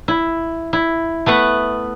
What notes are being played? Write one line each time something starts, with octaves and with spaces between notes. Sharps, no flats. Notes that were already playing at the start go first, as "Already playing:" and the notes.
E4
E4
A3 B3 B4 F#5